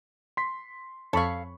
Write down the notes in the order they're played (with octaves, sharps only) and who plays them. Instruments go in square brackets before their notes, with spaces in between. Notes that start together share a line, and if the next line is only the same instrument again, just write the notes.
[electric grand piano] C6 B6
[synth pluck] F2 [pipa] A4 F5 [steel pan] C#5 B5 C#6